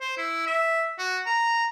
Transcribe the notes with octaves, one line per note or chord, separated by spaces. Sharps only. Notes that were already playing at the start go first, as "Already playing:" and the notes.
C5
E4
E5
F#4
A#5